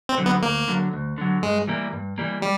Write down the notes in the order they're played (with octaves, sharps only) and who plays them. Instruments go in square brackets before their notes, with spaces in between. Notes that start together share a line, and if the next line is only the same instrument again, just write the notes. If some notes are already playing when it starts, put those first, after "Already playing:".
[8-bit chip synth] C4
[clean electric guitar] D3 F#3
[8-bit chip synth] B3
[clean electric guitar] D2 [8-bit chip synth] A#3
[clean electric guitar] D3 F#3
D2
D3 F#3
[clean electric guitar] G2 [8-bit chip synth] G#3
[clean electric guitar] E3 G3 A#3
G2
E3 G3 A#3
[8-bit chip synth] G3